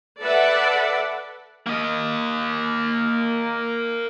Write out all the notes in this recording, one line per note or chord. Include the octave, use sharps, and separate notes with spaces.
A4 B4 D5 E5 F#5
A#3 D#5